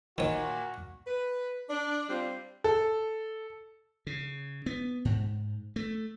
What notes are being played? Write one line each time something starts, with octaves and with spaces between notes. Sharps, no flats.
A#2 D#3 A#3 F#4 C#5
B4
D4
G3 C4 F4
A4
C#3
B3
G#2
A3